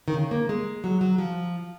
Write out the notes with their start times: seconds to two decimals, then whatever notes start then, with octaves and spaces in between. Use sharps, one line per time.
0.08 D#3
0.14 C#3
0.31 A#3
0.49 G#3
0.84 F#3
1.01 F#3
1.18 F3